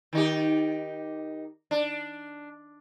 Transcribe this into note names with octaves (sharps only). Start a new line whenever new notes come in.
D#3 D#4 G4
D4